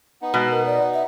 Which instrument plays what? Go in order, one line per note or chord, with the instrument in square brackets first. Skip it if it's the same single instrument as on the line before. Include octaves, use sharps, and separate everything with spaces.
[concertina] B3 D#4
[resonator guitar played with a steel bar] B2 [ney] G#3
[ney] A#4
D5
E5